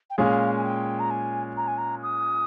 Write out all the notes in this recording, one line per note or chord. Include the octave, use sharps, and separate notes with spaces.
G5
A#2 G#3 C#4 G#4 F5
G#5
G5
A#5
G#5
A#5
G#5
A#5
D#6